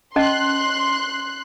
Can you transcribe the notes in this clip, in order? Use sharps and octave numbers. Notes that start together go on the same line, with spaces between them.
C#4 D#5 A5 C6 F#6